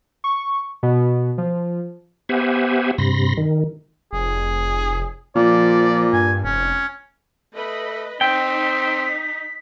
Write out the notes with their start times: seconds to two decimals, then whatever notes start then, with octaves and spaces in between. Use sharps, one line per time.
0.24 C#6
0.83 B2
1.38 F3
2.29 B3 G4 C5 E5 F#5 G#5
2.98 G2 C3 B5 C6 A#6
3.37 D#3
4.13 F1 G#4
5.36 A#2 F3 D5
6.13 G2 G#5
6.44 F1 C#4
7.55 A3 B4 D#5 B5
8.21 C4 D#4 G5 B6